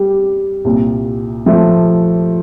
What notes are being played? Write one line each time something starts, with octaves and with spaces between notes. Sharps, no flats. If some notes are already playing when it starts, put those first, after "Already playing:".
Already playing: G3
C2 A#2
F3 A3